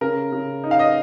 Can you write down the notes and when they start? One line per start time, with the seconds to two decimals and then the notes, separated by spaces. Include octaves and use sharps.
0.01 C#3 A#4
0.32 C#3
0.64 D#4
0.71 F5
0.79 D#5